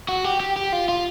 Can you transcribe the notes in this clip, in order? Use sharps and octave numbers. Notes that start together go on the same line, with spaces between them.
F#4
G4
G4
G4
F4
F4